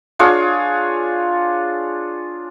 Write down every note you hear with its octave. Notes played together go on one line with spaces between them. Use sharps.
D4 F4 G#4 C#5